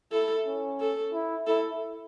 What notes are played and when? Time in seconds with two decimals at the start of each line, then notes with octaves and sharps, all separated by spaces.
0.12 E4 A4
0.46 C#4
0.80 A4
1.13 E4
1.47 E4 A4